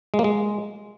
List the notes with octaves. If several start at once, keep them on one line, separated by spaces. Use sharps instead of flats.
G#3
A#3
G#3